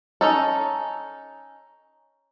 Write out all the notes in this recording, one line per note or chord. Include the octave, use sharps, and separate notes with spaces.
C#4 D#4 A4